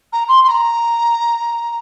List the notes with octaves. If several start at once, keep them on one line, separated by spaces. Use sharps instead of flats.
A#5
C6
C6
A#5